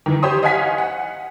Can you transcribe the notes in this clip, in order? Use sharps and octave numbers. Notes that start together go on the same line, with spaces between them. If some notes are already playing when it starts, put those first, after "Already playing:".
D#3 E3
G4 C5 C#5 C6 D#6
D#5 F5 F#5 G#5 B6
F#5